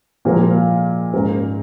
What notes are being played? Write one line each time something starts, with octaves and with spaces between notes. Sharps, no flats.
A#2 F3 G#3 F4 A#4
G#2 G#3 C#4 A#4